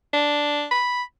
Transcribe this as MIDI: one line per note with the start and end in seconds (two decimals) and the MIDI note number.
0.13 0.66 62
0.71 1.03 83